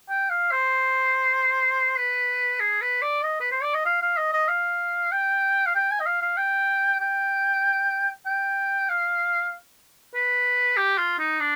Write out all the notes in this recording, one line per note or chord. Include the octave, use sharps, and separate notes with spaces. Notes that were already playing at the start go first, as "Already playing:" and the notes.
G5
F5
C5
B4
G#4
B4
D5
D#5
B4
C5
D5
D#5
F5
F5
D#5
D#5
F5
G5
F5
G5
G#5
D#5
F5
F5
G5
G5
G5
F5
B4
G4
F4
D#4
D4